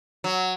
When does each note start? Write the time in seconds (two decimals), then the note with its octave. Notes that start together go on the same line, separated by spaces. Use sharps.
0.24 F#3